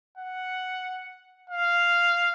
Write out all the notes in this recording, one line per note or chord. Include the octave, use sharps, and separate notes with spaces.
F#5
F5